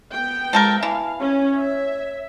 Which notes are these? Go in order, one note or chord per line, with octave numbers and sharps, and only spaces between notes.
B3 G5
F3 G#3 A4 A#4
E3 F5 A5
C#4 C#5
E5